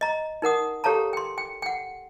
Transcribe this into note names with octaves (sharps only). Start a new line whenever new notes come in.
D#5 A#5
D#4 A#4 F#5 D#6
G4 A4 C#5 F5 A5 A#5
G5 C6
G5
F#5 G5